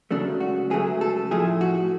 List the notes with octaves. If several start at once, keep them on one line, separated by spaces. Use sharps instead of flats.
C#2 C#3 F#3 A3 D4
F#4
C#2 C#3 F#3 A3 G#4
A4
A2 F3 A3 G#4
F#4